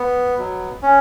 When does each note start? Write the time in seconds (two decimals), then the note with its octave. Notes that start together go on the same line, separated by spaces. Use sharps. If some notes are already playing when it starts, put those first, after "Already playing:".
Already playing: B3
0.38 B2 F#3
0.82 C#4